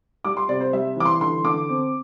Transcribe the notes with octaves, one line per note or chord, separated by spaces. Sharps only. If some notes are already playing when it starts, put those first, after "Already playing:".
G3 D6
C6
C3 D5
C5
G3 E5
E3 D6
C6
D3 C6
D3 D6
C4